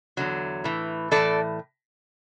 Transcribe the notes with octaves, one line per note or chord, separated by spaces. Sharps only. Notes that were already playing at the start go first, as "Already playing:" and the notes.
E2 D3 F#3
A2 E3
A2 E3 A4 D5